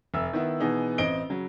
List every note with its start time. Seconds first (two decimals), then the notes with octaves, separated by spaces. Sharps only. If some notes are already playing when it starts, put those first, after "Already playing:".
0.14 F1 E5 E6
0.33 D#3 B3 E4
0.60 B2 E3 B3 D#4 G#4
0.98 A1 C4 D#5 D7 G7
1.30 C#3 F#3